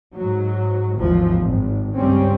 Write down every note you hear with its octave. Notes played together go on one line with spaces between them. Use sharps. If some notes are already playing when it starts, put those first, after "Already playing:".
G#2 F#3
G#1 D#2 E3 F3
G#1
C#2 G2 G3 C4 C#4